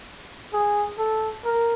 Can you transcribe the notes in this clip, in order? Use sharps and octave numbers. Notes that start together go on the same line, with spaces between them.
G#4
A4
A#4